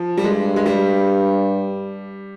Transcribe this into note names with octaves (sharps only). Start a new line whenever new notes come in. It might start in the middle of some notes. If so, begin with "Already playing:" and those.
Already playing: F3
G3
G2 G#3
G#3
G3